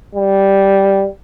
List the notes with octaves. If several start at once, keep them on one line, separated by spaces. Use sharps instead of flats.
G3